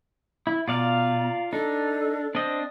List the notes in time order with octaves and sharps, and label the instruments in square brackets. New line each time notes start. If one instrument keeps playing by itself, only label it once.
[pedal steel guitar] E4
[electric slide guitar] B2 [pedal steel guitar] F4 D5 F5 [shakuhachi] A#5
[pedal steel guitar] D4 [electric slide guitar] D#4 [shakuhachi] A4
[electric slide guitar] C4 [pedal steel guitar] D4 D#5